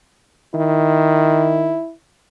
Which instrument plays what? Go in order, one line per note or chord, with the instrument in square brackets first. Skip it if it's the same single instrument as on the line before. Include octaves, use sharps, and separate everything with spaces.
[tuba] D#3 [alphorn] E4